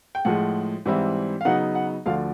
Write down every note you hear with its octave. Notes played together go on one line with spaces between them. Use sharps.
G5
A2 F3 G#3 F#5
G#2 E3 G3 C4 E4
F5
C#3 F#3 B3 D#4 F#5
F#5
D2 D3 F3 F5